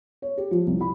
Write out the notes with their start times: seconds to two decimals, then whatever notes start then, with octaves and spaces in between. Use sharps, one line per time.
0.22 C#5
0.37 G4
0.51 F3
0.67 C2
0.81 B5